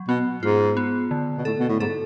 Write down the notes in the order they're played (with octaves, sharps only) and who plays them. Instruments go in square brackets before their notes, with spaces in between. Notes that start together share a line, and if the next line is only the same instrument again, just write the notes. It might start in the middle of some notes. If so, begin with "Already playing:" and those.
Already playing: [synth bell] F#3
[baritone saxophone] B2 [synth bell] B3
[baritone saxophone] G#2 [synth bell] F4
[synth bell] B3
D3
[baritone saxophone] B2
[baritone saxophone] A2 [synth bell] A4
[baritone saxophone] B2
A2
[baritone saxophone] G#2 [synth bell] A4